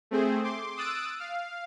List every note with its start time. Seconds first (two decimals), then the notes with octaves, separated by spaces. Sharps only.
0.11 A3 C4 G#4 C5
0.44 C6 D6
0.76 D#6 E6 F#6 A6 D7
1.19 F5